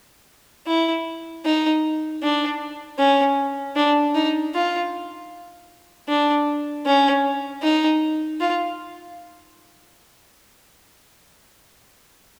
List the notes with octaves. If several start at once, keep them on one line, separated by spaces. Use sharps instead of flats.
E4
D#4
D4
C#4
D4
D#4
F4
D4
C#4
D#4
F4